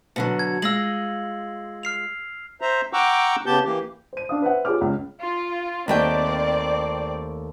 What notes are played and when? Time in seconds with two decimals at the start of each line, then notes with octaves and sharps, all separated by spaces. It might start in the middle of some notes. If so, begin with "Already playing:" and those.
0.16 B2 D3 F#3 C#7
0.39 G#6
0.62 G#3 F4 E6 A#6 F#7
1.83 F6 C7 F7
2.61 C5 E5 A#5
2.93 F#5 G5 A#5 C#6 D6 E6
3.46 C#3 B3 G4 A5 G6
3.64 E3 A#3 G4
4.13 C5 D#7
4.29 D4 F5 D#6
4.42 B4 C5 E5 F#5
4.65 F4 G4 G#4 C#5 D6 F6
4.81 C#2
5.21 F4
5.88 D#2 A3 C4 D5 G5